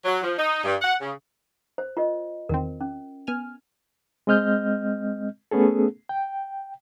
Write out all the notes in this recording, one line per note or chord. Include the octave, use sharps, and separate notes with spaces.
F#3
F3
D#4
G2
F#5
C#3
C5
F4 A#4 D#5
E2 D#3 C4 A#4
C#4
B3 G#5 F6
G#3 C4 D#5 F6 G6
A3 B3 C#4 G#4 A4
G5